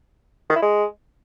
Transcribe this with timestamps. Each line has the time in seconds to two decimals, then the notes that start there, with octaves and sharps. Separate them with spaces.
0.50 D#3
0.56 E4
0.62 G#3